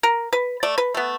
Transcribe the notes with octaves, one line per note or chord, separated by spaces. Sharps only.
A#4
B4
A3 D5
B4
A3 B3